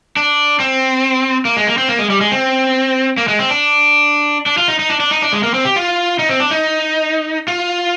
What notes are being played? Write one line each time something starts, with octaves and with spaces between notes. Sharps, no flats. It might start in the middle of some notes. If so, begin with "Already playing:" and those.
D4
C4
A#3
G#3
A#3
C4
A#3
G#3
G3
G#3
C4
A#3
G#3
C4
D4
D4
F4
D#4
D#4
D4
D4
D#4
D4
G#3
A#3
C4
G4
F4
D#4
C4
D4
D#4
F4